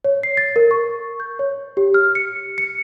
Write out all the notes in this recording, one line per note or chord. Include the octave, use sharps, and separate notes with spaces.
C#5
C7
A6
A#4
C#6
G6
C#5
G4
F6
C#7
C#7